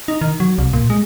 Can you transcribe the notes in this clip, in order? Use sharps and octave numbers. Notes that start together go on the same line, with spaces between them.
D#4
D#3
F#3
C2
A#2
G#3